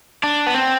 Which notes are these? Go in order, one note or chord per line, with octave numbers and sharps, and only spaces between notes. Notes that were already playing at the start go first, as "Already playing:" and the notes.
D4
B3
C4